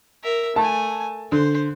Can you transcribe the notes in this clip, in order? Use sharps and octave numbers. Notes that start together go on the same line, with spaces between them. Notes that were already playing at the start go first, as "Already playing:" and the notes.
A#4 E5
A3 G#5 A5
D3 C5